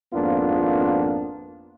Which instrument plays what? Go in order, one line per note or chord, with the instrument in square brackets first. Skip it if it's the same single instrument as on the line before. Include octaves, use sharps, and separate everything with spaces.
[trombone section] G#1 F2 A#3 B3 D4 F4